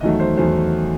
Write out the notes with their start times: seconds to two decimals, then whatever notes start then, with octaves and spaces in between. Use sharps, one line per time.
0.01 E2 D#3 F#3 A3 D#5
0.20 C5
0.37 E2 D#3 F#3 A3 C5